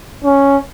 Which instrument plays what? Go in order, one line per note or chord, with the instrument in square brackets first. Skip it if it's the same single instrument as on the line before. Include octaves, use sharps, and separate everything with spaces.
[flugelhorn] C#4